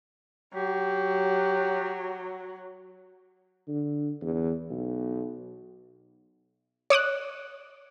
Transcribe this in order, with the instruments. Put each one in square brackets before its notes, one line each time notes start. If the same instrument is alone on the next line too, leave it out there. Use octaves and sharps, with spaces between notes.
[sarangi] F#3 [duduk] G4
[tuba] D3
E2
B1
[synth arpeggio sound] C#5 D6 D#6 F#6